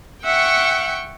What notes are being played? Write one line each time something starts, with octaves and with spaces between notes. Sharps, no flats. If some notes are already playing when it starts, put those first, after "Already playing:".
E5 F#5 G5 C#6